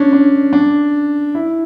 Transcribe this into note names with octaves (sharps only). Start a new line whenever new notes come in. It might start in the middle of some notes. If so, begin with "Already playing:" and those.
Already playing: C#4 D4
D4
D4
E4